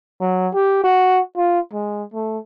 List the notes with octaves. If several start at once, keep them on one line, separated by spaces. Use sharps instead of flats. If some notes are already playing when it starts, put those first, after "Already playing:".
F#3
G4
F#4
F4
G#3
A3